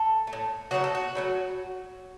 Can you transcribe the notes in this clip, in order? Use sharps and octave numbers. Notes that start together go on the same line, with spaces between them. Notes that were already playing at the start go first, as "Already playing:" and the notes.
Already playing: A4
A3
A2
C#3 F#3 A3 F#4
A4
F#4
C#3 F#3 A3